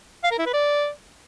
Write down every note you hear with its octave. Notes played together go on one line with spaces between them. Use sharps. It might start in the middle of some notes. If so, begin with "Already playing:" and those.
F5
A#4
E4
B4
D5